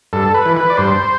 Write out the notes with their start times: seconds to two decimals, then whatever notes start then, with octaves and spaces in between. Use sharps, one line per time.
0.13 G2 A4
0.34 B4
0.46 E3
0.57 B4
0.70 D5
0.77 G2 C5